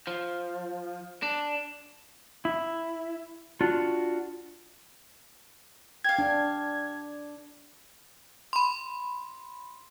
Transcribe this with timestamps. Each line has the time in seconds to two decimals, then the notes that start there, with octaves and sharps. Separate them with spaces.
0.07 F3
1.23 D4
2.45 E4
3.61 D4 F4 F#4
6.04 G4 F5 G#6
6.18 D4
8.53 B5 C6